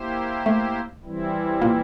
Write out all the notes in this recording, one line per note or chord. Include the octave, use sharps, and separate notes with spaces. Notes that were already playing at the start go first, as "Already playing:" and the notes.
Already playing: A#3 E4 G4 C5
A3
E3 G3 C4 E4
A#2 A#3